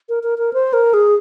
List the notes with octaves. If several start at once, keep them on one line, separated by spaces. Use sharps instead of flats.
A#4
A#4
A#4
C5
A#4
G#4